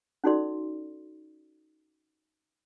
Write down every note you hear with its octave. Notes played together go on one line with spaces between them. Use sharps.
C#4 D#4 F#4 A4 D5 C6